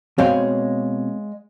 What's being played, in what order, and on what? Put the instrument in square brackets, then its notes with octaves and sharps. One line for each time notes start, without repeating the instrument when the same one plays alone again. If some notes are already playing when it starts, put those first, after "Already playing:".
[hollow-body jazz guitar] B2 C4 G5 [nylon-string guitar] G#3 C#5 F5